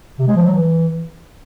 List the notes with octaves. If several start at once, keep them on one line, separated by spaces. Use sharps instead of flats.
C3
G#3
F3
F#3
E3